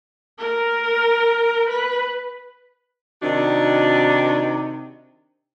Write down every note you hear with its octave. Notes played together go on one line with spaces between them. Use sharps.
A#4
B4
C3 D#3 D4 D#4 F#4